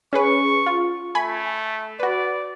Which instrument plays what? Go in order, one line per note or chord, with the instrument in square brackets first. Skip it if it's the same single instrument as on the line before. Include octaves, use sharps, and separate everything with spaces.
[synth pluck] C#4 G#4 B4 [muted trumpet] C#6
[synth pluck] F4
[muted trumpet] A3 [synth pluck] G#5 B5
[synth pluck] F#4 B4 [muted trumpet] D5